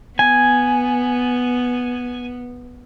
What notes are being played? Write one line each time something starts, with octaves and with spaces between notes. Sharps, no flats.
B3 G#5